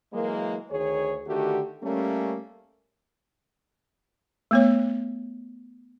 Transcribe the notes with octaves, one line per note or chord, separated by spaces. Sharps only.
E3 F#3 G#3 A#3
D2 D#3 G#4 C#5
D3 D#3 A3 F#4 G4
G3 A3 A#3 C#4
A3 B3 C#5